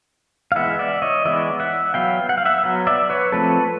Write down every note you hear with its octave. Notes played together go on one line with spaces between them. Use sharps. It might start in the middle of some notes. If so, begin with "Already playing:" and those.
F5
E3 G#3 B3 E5 F#5
D5 E5
C#5 D#5
E3 G#3 B3 D5 E5
E5 F#5
F#3 B3 F5 G5
F#5
F5
E5 F#5
F#3 B3
D5 E5
B4 C#5
F3 A3 C4 A4 B4